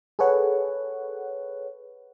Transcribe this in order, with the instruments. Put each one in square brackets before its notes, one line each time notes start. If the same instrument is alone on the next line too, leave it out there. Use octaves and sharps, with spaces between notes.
[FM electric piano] G#4 A4 B4 C#5 F#5